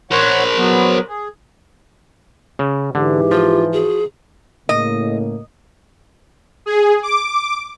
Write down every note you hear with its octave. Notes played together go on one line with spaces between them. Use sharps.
A#4 C5 C#5 F#5
F#3 B3
G#4
C#3
G#2 D3 E3 G4
F3 F4
F#4 G#4
A2 C#3 A#3 D#5
G#4
D6